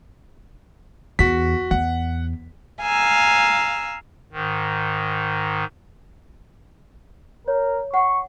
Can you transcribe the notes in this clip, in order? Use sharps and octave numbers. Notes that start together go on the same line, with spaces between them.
E2 F#4 B6
E2 F#5
F5 G#5 A#5 E6
G#2 D#3
A#4 C#5
F#5 C#6